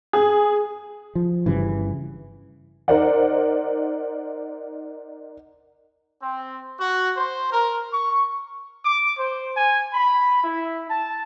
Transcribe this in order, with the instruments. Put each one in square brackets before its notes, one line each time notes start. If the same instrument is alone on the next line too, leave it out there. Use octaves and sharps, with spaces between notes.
[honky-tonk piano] G#4
[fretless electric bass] F3
G1 G2 C#3 E3
[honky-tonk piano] D#4 A#4 C5 D5 F#5
[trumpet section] C4
F#4
C5
A#4
C#6
D6
C5
G#5
B5
E4
A5